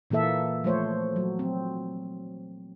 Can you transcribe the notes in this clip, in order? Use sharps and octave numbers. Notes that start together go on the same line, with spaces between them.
A#2 E3 A#3 A4 E5
F3 A3 C5 C#5
F#3
C4